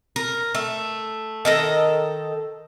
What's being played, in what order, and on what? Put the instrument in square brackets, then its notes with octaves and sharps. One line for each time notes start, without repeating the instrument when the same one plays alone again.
[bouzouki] A#4
A3
D#3 A4 A#5